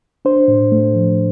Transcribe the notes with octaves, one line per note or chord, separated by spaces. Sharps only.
D4 C5
A2
A3
F3